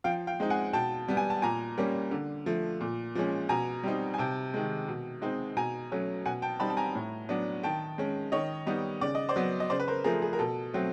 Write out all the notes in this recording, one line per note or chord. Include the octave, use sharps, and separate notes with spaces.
F3 F5 G5
F5 G5
G#3 C4 D#4
F#5 G#5
B2 G5 A5
G3 B3
G#5
A5
A#2 G#5 A#5
G3 A#3 C#4
D3
F3 A3
A#2
F3 G#3 C#4
B2 G#5 A#5
G3 C4 D#4
G#5
C3 G5 A5
D#3 G#3
B2
G#3 C4 D#4
B2 G#5 A#5
F#3 A3 C#4
B2 F#5 G#5
G5 A5
G3 C4 D#4 A5 B5
A5
G#5 A#5
A2
F#3 B3 D4
D#3 G5 A5
G#3 C#4
D#3 C#5 D#5
G3 B3 D#4
C#3 D5
D#5
C5 D5
F#3 B3
D#5
C#3 C5 D5
B4
A#4 C5
F3 A3 G#4 A#4
G#4
A#4
B2 A4
F#3 A3 C4